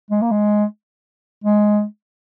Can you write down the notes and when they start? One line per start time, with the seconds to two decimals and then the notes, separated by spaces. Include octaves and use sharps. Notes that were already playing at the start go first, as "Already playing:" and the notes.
0.11 G#3
0.22 A#3
0.31 G#3
1.44 G#3